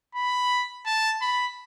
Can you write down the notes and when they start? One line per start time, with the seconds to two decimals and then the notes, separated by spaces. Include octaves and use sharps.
0.15 B5
0.86 A5
1.22 B5